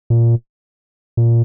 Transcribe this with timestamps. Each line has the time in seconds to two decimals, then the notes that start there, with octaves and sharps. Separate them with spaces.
0.10 A#2
1.17 A#2